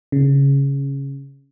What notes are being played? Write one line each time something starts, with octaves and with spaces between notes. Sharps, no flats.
C#3